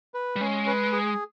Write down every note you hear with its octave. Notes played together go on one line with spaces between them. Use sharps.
B4
G3
G#3 C#4
B4
G#4